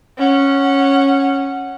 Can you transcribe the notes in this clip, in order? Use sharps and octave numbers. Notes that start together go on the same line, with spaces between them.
C#4 F#5